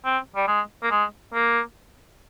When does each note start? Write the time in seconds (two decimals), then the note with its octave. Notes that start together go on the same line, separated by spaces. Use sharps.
0.05 C4
0.36 G3
0.48 G#3
0.83 A#3
0.91 G#3
1.34 A#3